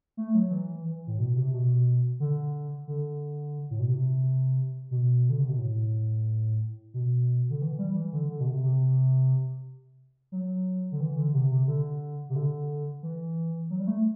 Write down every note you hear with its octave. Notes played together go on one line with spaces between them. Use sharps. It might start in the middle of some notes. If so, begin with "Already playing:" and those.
A3
F#3
E3
E3
A2
B2
C3
B2
D3
D3
A2
B2
C3
B2
D3
C3
B2
A2
B2
D3
E3
G3
E3
D3
D3
B2
C3
C3
F#3
D3
E3
D3
C3
C3
D3
C3
D3
E3
F#3
G3
A3